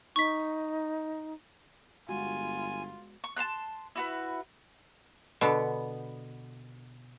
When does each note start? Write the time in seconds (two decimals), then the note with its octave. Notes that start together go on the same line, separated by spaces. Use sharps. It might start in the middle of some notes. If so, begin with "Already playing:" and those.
0.16 D#4 C#6 B6
2.09 G1 G#3 B3 F4 F#4 G#5
3.24 C#6
3.36 A5 A#5 C6 F#6
3.96 E4 F#4 B4
5.41 B2 D3 B3